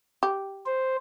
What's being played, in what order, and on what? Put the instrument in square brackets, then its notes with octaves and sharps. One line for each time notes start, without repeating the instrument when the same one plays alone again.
[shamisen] G4
[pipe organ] C5